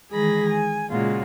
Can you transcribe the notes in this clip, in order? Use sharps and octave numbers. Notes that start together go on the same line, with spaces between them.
D#3 E3 G#3 G#4 B5 A#6
G#5
A#2 C#3 G#3 F4 F#4